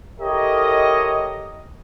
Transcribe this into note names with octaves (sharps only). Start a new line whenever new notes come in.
E4 G4 A4 A#4 C#5 D#5